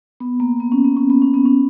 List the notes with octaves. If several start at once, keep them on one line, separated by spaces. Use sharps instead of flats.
B3
A#3
B3
C#4
B3
C#4
B3
C#4
B3
C#4